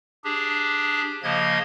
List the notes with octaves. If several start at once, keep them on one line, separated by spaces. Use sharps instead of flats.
D4 G4 G#4
C#3 F3 A#3 D#5 G#6